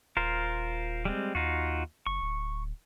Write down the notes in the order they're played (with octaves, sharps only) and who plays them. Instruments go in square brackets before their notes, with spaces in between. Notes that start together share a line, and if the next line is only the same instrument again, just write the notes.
[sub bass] D#1 [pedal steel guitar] F4 A#4 C5
[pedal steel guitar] G3 G#3 C4
[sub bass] D#2 [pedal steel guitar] D#4 F4 F#4
[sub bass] F#1 [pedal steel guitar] C#6
[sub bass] D1